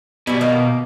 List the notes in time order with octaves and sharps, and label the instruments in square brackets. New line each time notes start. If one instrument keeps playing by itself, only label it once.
[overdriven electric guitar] B2 [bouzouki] G3 E4
[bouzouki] D#3 A#3